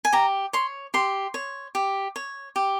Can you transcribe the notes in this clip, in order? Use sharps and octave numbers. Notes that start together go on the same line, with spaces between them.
G#5
G4 A#5
C#5 C6
G4 C6
C#5
G4
C#5
G4